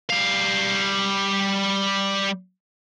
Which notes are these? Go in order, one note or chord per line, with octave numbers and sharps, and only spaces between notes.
G3 F5